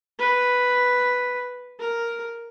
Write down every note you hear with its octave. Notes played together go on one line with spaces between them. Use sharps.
B4
A#4